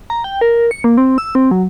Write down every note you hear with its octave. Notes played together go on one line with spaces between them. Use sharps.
A#5
G5
A#4
C#7
A#3
C4
E6
C4
F#3